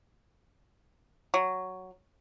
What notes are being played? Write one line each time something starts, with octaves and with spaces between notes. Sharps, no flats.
F#3